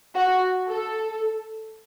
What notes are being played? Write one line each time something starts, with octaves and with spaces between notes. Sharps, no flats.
F#4
A4